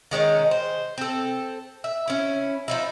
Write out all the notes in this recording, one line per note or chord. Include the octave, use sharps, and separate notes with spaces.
D#3 G#3 C#4 A#4
C5
C4 A4
E5
C#4 E4
F3 D#4 E4